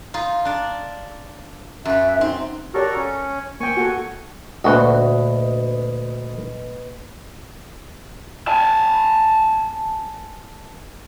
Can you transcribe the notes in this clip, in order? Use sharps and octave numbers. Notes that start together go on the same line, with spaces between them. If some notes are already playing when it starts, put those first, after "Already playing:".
D#4 F4
D4 D5
F#2 F#4 E5
C4 D#4
F#4 G4 A4 A#4 C#5 D5
C#4
A#3 G5 G#5 C#6
F#4 A4
D2 A#2 F#4 B4 D#5
G#5 A5